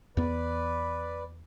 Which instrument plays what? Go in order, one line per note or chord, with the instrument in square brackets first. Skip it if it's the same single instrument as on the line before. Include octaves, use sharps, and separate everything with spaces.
[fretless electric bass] E2 B3 [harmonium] B4 D5